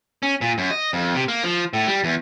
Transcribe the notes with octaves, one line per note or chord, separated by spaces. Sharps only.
C#4
A#2
F#2
D#5
F2
C3
A#3
F3
A2
G3
E2